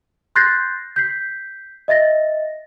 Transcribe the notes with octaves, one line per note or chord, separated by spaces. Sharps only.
C6 F#6 G6 A6 A#6 C7
G6 B6 C7
D#5 E5 A6 A#6